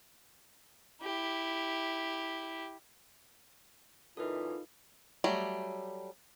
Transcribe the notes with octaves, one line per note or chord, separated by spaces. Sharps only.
E4 G4
F#2 A#2 E3 D#4 F4 A4 B4
F#3 G3 A3